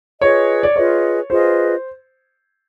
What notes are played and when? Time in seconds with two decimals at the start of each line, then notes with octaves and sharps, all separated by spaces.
0.20 F4 G#4 B4 C#5 D#5
0.63 D5
0.76 F4 G#4 B4 C#5 D#5
1.30 F4 G#4 B4 C5 D#5